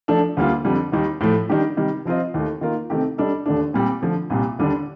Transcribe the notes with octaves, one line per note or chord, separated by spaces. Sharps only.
F3 A3 D4 A4
D2 D3 G3 A#3 F4
F2 D3 G3
D#2 D#3 G3
A2 F3 A3
D#3 G3 D4 G4
C3 D#3 G3
F3 C4 F4 C5 D#5
D#2 D#3 A3
D#3 A#3 F4 A#4
C3 D#3 A3 C4 G4
G3 D4 A4 D#5
D#2 D3 A3 D4
A#2 G3 C4 G4
D3 F3 A3
C2 A#2 G3
D#2 D3 G3 D4